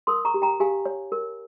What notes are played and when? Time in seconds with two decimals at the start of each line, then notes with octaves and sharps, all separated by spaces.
0.07 A#4 C6 D#6
0.25 A#5 C#6
0.34 G4
0.42 G5 A#5
0.60 G4 F5 G#5
0.86 C#5
1.12 A#4